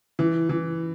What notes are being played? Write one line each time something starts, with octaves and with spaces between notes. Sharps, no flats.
E3
E3